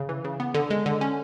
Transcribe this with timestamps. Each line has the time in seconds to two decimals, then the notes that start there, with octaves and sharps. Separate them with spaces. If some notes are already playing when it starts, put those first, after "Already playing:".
Already playing: C#3
0.09 E3
0.25 C#3
0.40 B3
0.54 D3
0.70 G#3
0.86 D3
1.01 C#4